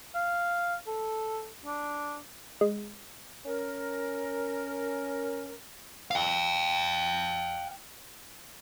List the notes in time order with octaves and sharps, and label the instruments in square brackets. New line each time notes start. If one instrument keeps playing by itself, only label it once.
[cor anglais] F5
A4
D4
[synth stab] G#3
[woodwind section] C#4 A#4
[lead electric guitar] F5 G5